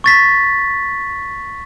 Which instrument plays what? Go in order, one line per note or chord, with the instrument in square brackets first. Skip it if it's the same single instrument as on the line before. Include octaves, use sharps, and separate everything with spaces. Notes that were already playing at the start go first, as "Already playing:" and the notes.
[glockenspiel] C#6 A6 B6